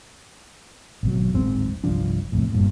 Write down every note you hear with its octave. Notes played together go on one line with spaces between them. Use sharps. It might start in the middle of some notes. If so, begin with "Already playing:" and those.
G#1 B2 F#3
D1 G#1 G#2 C4
G1 C2 F3 D4
C2 F2 A2
G1 G2 A#2